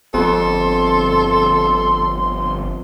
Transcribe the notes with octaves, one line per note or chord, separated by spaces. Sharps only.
G1 F2 A4 C6